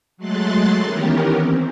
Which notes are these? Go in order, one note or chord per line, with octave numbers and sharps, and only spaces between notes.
F#3 G#3 A3 C6 F#6 A6
D#3 E3 B3 C#4 G4 A#4
C4